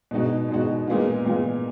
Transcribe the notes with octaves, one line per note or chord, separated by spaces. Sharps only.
B2 G#3 D#4 F#4
B2 G#3 D#4 F#4
A#2 G#3 B3 F4
A#2 G#3 B3 F4